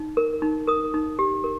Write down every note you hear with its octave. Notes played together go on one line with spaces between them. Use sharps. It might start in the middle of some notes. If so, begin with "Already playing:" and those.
Already playing: D#4
A#4
D#4
A#4 D#6
D#4
G4
A#4